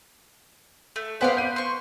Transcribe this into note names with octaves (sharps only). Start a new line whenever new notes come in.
A3
B3 B4 C5 D5 F5 F#6
G6 D#7
C6 C#6